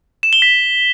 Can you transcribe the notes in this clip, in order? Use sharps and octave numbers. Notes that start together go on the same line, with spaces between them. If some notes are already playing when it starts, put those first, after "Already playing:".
E7
G7
B6